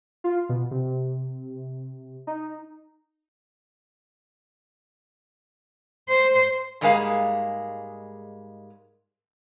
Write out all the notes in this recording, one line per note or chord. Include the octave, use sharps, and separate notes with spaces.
F4
B2
C3
D#4
C5
G#2 G3 G#3 A#3 G#4 F5